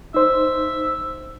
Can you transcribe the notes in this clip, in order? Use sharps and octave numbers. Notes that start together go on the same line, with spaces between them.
D#4 C5 E5